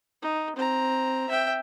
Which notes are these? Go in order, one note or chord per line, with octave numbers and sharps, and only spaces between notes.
D#4
C4 A#5
E5 G5